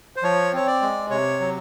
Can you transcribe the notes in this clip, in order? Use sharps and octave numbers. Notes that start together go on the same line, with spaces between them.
C5
F3 C#5
C4 C#5
D5
G#3
C3 C#5
F#3